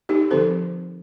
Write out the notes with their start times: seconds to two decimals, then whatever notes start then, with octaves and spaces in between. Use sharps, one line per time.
0.09 D#4 G4
0.31 D3 F3 C4 A4 C5